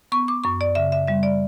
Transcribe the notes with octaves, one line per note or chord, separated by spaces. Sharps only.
B3 C#6
D6
F#2 C#6
D5
C#3 E5
E5
G3 E5
D5